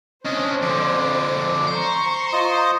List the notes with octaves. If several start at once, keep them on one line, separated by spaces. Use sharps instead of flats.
C#4 D4 C5 D#5
F2 D3 D5
C5 A#5 C#6
F4 D#5 D#6